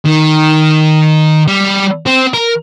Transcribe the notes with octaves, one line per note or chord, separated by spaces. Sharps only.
D#3
G3
C4
A#4